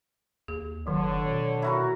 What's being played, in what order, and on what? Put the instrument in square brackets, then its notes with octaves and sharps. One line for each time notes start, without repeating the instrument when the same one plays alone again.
[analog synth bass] D#2 [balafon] G#4
[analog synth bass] F#1 [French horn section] D3 C#5 [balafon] D#3 F#3
[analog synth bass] B2
[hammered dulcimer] E4 F#4 A#4